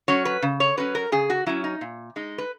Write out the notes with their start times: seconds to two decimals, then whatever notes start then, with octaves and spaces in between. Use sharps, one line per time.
0.08 F#3 C#4 C#5
0.25 B4
0.42 C#3
0.60 C#5
0.77 F#3 C#4 B4
0.95 A#4
1.12 C#3 G#4
1.30 F#4
1.46 F#3 C#4 E4
1.64 D#4
1.81 A#2
2.16 G#3 D#4
2.38 B4